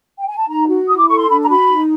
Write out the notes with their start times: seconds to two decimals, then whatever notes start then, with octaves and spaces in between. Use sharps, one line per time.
0.17 G5
0.27 G#5
0.38 A5
0.48 D#4 A#5
0.68 F#4
0.87 E4 D#6
0.98 D6
1.08 A4 C#6
1.19 C6
1.29 D4 B5
1.42 A#5
1.49 F#4 B5
1.70 D#4